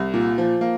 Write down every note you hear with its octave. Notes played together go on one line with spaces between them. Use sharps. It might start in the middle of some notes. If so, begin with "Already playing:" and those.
Already playing: C2
A#2
F3
A#3